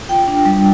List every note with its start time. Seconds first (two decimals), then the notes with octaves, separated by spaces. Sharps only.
0.09 F4 G5
0.28 D4
0.45 G3